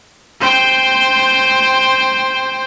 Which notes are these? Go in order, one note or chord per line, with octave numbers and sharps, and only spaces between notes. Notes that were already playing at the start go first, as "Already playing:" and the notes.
C5 G5